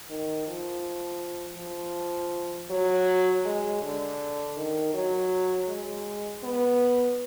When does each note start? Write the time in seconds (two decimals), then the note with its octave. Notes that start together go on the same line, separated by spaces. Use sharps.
0.10 D#3
0.48 F3
1.58 F3
2.70 F#3
3.45 G#3
3.82 D3
4.57 D#3
4.94 F#3
5.68 G#3
6.44 B3